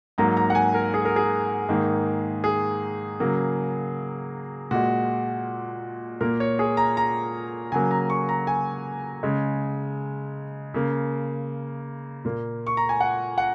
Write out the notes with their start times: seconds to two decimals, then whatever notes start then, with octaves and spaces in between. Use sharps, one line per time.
0.18 G#2 F#3 A#3 A#5
0.37 A#5
0.50 F#5
0.55 G#5
0.74 A#4
0.94 G#4
1.05 A#4
1.16 G#4
1.69 G#2 D#3 A#3
2.44 G#4
3.20 C#3 F#3 A#3
4.71 A#2 G#3 F#4
6.21 A#2 A#3 A#4
6.40 C#5
6.59 G#4
6.77 A#5
6.97 A#5
7.72 C#3 F#3 A#3 G#5
7.91 A#5
8.10 C#6
8.29 A#5
8.47 G#5
9.23 C#3 G#3
10.74 C#3 A#3
12.25 A#2 A#3
12.67 C#6
12.77 A#5
12.89 G#5
13.00 F#5
13.38 F#5